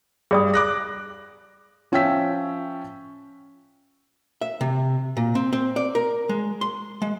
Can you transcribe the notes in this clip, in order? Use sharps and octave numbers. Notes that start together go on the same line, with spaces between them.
G2 G#4 D5 D#6
D6 F#6 A#6
F3 C#4 E5 G5 E6 B6
E5
C3
A#2
C4
C4
D5
A#4
G#3
C6
G#3